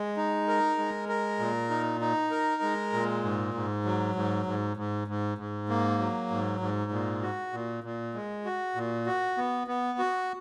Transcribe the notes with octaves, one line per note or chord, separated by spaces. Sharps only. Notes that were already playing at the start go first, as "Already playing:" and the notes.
Already playing: G#3
D#4
A#4
G#3
A#4
A#2
D#4
D#4
A#4
G#3
A#2
G#2
G#2
F#3
G#2
G#2
G#2
G#2
G#2
A#3
F#3
G#2
G#2
A#2
F#4
A#2
A#2
G#3
F#4
A#2
F#4
B3
B3
F#4